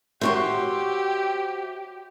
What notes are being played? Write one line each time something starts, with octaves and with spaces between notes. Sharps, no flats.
F#4 G4 C5 C#5 E5 C6